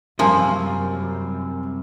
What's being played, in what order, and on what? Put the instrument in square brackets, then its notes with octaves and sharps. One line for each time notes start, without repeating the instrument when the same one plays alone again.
[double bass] F#2 [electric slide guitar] C3 G3 C4 [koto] F3 A#3 [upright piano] A#4 G#5